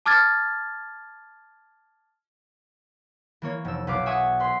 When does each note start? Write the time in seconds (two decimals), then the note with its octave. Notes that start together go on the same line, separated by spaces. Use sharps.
0.06 A5 D6 F6 G#6 A6
3.42 E3 A#3 C#5
3.65 F1 E6
3.87 B1 B4 F5 D6
4.06 E5 F#5 G#5 C#6 D#6
4.40 B4 C6